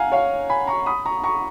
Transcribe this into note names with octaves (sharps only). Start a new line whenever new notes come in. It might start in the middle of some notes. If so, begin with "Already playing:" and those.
Already playing: F5 F#5 G#5 A#5
C#5 F5
G#5 B5
A#5 C#6
B5 D#6
A#5 C#6
A#5 C#6